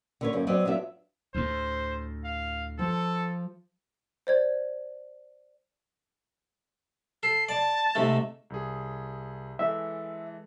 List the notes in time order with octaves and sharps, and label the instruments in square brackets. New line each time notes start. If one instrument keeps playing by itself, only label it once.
[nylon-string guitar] D3 B4 C#5
F#2 A#3 C#4
F#3 B3 C4 D5 D#5
F#3 B3 D4 F4 E5
[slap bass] D2 A2 [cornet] C5
[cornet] F5
[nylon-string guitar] F3 [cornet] A4
[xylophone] C5 D5 G#6
[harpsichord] A4 [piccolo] C7
[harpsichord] D5 [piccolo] A5
[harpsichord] G#2 C3 A3
[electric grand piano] C2 G#4
[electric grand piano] E3 G#3 A4 [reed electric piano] E5